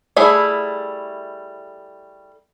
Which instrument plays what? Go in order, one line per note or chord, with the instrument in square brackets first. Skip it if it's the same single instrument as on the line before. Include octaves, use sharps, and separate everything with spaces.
[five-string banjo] G3 A3 E4 G#4